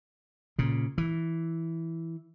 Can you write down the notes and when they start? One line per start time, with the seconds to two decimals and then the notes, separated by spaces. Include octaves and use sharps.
0.59 A#2 C#3
0.98 E3